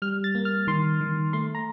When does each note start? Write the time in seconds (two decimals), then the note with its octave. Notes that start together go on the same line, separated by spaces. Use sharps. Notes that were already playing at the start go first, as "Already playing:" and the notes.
0.02 G3 F6
0.24 A6
0.35 A#3
0.45 F6
0.67 D#3 C6
1.01 D#3
1.33 A3 C6
1.55 A#5